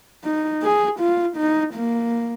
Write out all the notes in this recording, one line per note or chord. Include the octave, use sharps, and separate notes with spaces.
D#4
G#4
F4
D#4
A#3